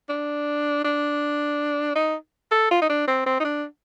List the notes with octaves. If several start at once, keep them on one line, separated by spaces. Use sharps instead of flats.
D4
D4
D#4
A4
F4
D#4
D4
C4
C4
D#4
D4